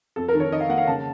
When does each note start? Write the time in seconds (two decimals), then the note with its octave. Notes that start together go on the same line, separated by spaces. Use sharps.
0.16 F2 A4
0.28 A#4
0.35 D#3
0.40 C#5
0.51 D#4 D#5
0.61 F5
0.69 A#3 F#5
0.78 F5
0.87 C#3 A5